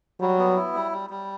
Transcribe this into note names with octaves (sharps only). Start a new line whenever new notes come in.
F#3 G3
B3
E4
G3
G3
G3